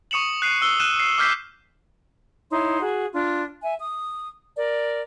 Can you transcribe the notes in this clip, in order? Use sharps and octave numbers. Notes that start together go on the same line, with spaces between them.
C#6 D#6 C#7 E7 F#7
F#6 C7 D#7
E6 G7
F6 F#6 D#7 E7
C7
D6 F6 G6 B6 C7
D#4 E4 C#5 C6
F#4 G#4
D4 F4
E5 G#5
D#6
A#4 D5